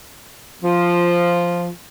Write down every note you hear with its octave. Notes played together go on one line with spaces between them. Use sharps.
F3